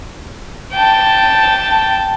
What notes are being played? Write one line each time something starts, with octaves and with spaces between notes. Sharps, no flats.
G5 A5